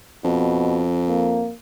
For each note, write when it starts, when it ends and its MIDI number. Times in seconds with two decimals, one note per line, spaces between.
0.24 1.49 41
0.24 0.82 47
1.08 1.53 58